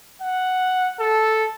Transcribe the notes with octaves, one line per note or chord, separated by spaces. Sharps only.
F#5
A4